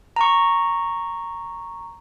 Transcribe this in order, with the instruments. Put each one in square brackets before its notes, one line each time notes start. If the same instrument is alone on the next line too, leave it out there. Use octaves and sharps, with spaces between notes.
[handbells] A#5 C#6